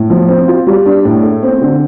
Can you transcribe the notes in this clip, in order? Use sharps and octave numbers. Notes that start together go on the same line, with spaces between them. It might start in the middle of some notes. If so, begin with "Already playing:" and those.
Already playing: A2
F3
C4
F4
G3
D4
A2
A3
C4
D3